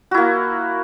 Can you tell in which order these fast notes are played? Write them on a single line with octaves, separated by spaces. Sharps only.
F#4 E4 A#3